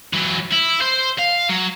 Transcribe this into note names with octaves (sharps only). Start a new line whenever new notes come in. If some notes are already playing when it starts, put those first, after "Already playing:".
E3 F#3
E4
C5
F5
F#3